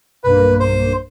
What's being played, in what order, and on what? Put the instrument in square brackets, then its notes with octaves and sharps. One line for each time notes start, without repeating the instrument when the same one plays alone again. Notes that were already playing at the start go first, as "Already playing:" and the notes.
[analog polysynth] B1 G2 A#3 [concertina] B4
[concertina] C5